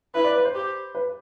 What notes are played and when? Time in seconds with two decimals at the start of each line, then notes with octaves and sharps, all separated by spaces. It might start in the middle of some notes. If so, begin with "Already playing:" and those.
0.15 E4 B4
0.24 D5
0.35 B4
0.45 C5
0.55 G4
0.95 B4